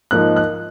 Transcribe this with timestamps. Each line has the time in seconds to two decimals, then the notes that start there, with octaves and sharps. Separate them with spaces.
0.11 G#2 F3 A#3 D#4 F#6
0.36 F#6